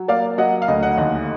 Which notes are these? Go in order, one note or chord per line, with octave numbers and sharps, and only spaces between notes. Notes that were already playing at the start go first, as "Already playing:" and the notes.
Already playing: F#3
A#3 D5 F5
F#3 D#5 F#5
F5
D2 D#5
D#5 F#5
D#2 D#5 F#5